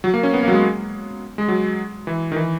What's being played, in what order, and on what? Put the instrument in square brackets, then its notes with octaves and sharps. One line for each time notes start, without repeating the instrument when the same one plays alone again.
[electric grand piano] F#3
A#3
C#4
B3
A#3
F#3
G#3
G#3
F#3
E3
D#3
E3